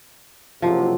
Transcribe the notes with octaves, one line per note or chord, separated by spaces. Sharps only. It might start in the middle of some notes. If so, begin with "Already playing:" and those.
F#1 C3 F3 F#3